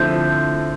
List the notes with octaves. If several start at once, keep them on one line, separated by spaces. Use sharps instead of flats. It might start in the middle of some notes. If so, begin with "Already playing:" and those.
Already playing: D3 F3 A3 C4 E4 G6